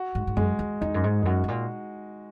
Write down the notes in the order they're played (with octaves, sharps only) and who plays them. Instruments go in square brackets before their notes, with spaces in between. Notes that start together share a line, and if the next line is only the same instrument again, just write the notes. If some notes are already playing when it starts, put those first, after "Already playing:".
Already playing: [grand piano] F#4
[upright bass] G#2
G#2
[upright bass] F#2 [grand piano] G#3
[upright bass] E2
[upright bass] E2 [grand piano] D#4
[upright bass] F#2
G#2
E2
[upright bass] F#2 [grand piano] F#4
[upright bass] G#2
A#2